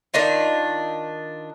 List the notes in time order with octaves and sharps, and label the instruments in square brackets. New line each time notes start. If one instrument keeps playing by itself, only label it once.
[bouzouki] D#3 D4 D#4 F4